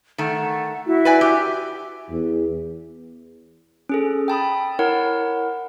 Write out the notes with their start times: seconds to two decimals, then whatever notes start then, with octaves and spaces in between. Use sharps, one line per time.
0.18 D#3 A3 F#5
0.87 E4 F#4 E5
1.05 B4 D5 G#5
1.21 G4
2.10 E2
3.89 C#4 G#4 A4
4.28 G5 A5 B5 D#6
4.79 E4 A#4 C#5 F#5